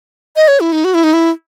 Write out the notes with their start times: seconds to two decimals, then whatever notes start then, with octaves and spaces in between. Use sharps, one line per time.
0.36 D#5
0.48 C#5
0.60 E4
0.72 D#4
0.84 F#4
0.94 E4
1.04 D#4
1.13 E4